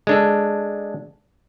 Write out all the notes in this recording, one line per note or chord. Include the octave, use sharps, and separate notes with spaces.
G#3 D4 A4